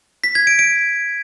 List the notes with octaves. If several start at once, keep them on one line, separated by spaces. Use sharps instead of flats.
B6
G#6
D7
D7